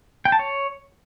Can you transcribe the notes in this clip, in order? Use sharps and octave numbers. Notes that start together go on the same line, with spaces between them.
G5
A5
C#5